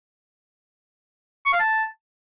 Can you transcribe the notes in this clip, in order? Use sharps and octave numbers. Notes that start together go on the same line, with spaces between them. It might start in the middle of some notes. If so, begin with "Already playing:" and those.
C#6
F5
A5